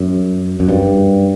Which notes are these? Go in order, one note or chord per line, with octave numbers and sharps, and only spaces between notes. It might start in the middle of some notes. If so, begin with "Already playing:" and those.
Already playing: F#2
F#2
G2